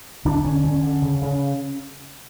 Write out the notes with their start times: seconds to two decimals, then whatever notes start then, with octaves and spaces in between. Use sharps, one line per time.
0.25 D3 D4
0.44 D3 C#4
0.64 D3 C#4
0.83 D3
1.02 C#3
1.21 C#3